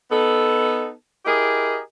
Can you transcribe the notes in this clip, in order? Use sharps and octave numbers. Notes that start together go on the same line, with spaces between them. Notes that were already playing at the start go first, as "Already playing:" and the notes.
B3 D#4 A4
E4 G4 G#4 A#4 D#5